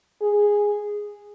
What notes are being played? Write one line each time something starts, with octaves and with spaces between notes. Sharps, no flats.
G#4